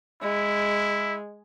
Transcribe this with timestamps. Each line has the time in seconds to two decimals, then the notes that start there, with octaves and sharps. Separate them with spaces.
0.22 G#3 E4